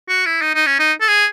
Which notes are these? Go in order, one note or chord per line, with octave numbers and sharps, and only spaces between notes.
F#4
E4
D#4
D#4
C#4
D#4
A4
G#4